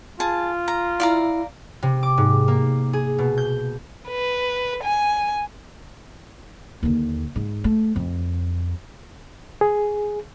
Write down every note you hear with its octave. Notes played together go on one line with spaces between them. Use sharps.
F4 G#4 A5
A#5
E4 D5 F5 A#5
C3
D6
G#2
A#3
G#4
B2
G6
B4
G#5
D#2 D3
G#2
A3
F2
G#4